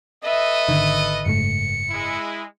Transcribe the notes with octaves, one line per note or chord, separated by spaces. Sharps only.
A4 B4 D#5 E5
G#1 D3 D#3
F#1 G#2 A3 C#7
G#3 E4